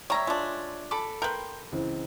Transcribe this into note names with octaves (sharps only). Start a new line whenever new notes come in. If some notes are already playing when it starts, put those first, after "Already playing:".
G3 C#5 E5 A#5
G#3 D4 F4
A4 B5 D6
A#4 B4 G5 C6 G6
C#2 E3 C4